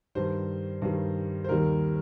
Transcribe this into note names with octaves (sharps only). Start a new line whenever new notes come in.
G2 D#3 G3 C5
G2 D#3 G3
C5
D#2 D#3 G3 A#4